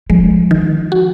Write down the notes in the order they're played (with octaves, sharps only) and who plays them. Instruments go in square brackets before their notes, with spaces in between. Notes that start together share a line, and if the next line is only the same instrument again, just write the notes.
[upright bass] F3 [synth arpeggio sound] G#3
[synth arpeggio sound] D#3
F#4